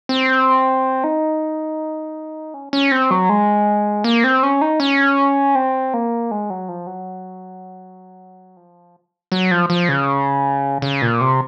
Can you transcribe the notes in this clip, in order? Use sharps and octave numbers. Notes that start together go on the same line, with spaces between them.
C4
D#4
C#4
C#4
C4
F#3
G#3
A#3
C4
C#4
D#4
C#4
C4
A#3
G#3
F#3
F3
F#3
F3
F#3
F3
F3
C#3
C#3
A#2
C3